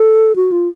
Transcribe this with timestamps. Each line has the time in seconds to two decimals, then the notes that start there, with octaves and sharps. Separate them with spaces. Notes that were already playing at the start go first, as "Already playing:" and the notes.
Already playing: A4
0.36 F#4
0.52 F4